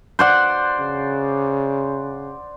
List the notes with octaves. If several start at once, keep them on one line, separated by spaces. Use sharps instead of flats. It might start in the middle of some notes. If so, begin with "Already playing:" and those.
C5 D5 F#5
C#3